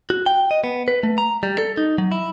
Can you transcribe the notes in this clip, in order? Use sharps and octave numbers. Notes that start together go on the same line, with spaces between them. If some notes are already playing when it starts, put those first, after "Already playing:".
F#4
G5
D#5
B3
B4
A3
A#5
G3
A4
D#4
F#3
E4